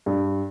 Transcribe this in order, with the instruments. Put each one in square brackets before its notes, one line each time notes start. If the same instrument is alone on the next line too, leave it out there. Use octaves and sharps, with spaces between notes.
[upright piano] G2